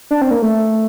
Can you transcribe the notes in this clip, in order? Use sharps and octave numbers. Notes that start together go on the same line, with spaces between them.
D4
C4
A#3
A3